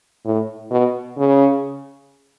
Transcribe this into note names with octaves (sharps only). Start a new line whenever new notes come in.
A2
B2
C#3